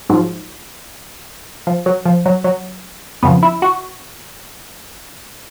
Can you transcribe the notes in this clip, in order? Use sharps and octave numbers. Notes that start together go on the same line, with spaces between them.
G#2 F3 F#3
F3
F#3
F3
F#3
F#3
F2 C#3 F3 B3
E4
F#4